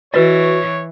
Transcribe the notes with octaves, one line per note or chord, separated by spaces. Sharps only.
E3 F#4 B4 C#5 D#5